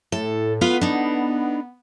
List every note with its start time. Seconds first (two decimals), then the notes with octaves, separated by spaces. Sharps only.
0.12 A2 A4
0.61 B3 F4 B4 F5
0.81 D4 D#4